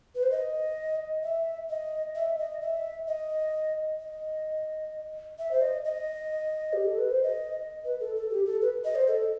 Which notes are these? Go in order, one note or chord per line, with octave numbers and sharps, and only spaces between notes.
B4
C5
D#5
E5
D#5
E5
D#5
E5
D#5
D#5
E5
C5
D#5
D#5
G4
A4
B4
C5
D#5
B4
A4
A4
G4
A4
B4
D#5
C5
A4